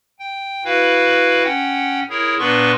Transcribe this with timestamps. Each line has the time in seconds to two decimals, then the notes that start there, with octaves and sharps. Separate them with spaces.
0.19 G5
0.65 E4 F#4 B4 F5
1.44 C#4 F#5 G5
2.10 E4 G#4 A#4 C#5
2.39 A#2 B3 D4 B4 C6 C#6